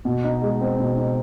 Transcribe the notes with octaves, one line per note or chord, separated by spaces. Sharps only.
B2
D#4
G#3
C4
B2
D#4